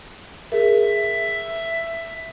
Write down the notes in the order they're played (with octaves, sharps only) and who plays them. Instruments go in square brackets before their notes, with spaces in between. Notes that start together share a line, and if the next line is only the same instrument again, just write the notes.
[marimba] G#4 A#4 [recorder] E5